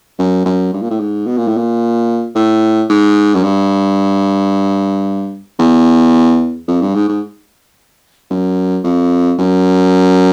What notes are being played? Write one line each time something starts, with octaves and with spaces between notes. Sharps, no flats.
F#2
F#2
G2
A#2
A2
G#2
B2
A#2
A2
A#2
A2
G#2
F#2
G2
E2
F2
G2
G#2
G#2
F#2
F2
F#2